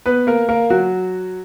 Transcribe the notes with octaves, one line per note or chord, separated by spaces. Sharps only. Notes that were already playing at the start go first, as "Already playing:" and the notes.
B3 B4
A#3 A#4
A#3 A#4
F#3 F#4